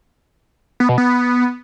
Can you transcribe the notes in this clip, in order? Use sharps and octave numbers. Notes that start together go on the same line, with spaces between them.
B3
B2
B3